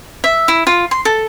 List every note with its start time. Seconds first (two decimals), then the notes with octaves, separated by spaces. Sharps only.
0.24 E5
0.48 E4
0.67 F4
0.91 C6
1.05 A4